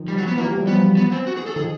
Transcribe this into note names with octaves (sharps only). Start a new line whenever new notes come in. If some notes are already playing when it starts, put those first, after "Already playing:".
Already playing: D#3 F3
G3
F#3
B3
E3 F#3 A#3
F3 G3
E3 F#3
F3 G3 B3
B3
C4
F#4
G#4
A4
D#3 F3 G#4